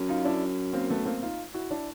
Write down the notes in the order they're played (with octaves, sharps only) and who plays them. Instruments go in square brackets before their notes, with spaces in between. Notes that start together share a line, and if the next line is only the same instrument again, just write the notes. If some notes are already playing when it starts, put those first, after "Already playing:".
Already playing: [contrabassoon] F#2
[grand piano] D#4 F4
D4 E4
A#3 C4
A3 B3
A#3 C4
D#4 F4
E4 F#4
D4 E4